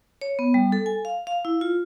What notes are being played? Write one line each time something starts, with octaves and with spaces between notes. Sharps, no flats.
C#5
B3
G3
A4
G#5
F5
F5
E4
F4